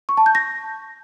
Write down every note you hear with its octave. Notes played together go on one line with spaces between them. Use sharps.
C#6
A5
G6
A#6